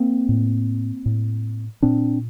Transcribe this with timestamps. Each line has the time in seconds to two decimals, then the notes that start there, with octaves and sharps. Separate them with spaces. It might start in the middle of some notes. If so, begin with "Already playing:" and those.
Already playing: A#3 C4
0.29 A2
1.06 A2
1.83 A#2 C4 D4